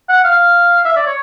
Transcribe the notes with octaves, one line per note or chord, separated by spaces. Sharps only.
F#5
F5
E5
D5
C#5